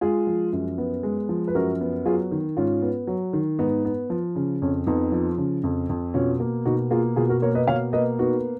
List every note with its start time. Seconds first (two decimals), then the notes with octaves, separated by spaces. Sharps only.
0.01 G#3 F4 G#4
0.27 F3
0.53 F#2
0.78 B3
1.03 G#3
1.29 F3
1.48 B4
1.55 F#2 F#4 A#4
1.81 B3
2.06 F#3 F4 G#4
2.31 D#3
2.57 G#2 C#4 F4
2.82 B3
3.07 F#3
3.33 D#3
3.59 G#2 B3 D#4
3.85 B3
4.10 F3
4.36 C#3
4.62 F2 C#4
4.87 F2 B3 D#4
5.12 F3
5.38 C#3
5.64 F2
5.89 F2
6.14 B2 C#4 F4
6.40 A#3
6.65 B2 D#4 F#4
6.91 A#3 F4 G#4
7.16 B2 F4 G#4
7.29 F#4 A#4
7.42 A#3 A#4 C#5
7.54 B4 D#5
7.67 B2 C#5 F5
7.93 A#3 B4 D#5
8.19 B3 D#4 F#4